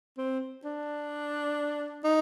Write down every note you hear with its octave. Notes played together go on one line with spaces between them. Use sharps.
C4
D4
D#4